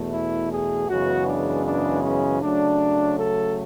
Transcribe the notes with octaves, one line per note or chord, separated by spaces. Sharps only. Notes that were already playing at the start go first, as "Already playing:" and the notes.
Already playing: E2 B2 A3
E4
G#4
F#2 C#3 E3 G#3 B3 F#4
D4
D4
C#4
C#3 F#3 A3 D4
A4